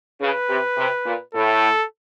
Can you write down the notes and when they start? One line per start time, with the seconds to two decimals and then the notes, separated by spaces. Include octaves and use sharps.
0.21 C#3 B4
0.50 C3
0.78 C3
1.06 A#2
1.35 A2 A4